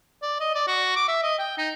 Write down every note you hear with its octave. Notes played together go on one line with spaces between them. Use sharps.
D5
D#5
D5
F#4
D6
E5
D#5
G5
D#4